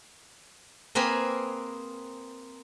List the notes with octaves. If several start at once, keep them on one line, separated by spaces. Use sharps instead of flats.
A#3 C4 G#4 A#4 B4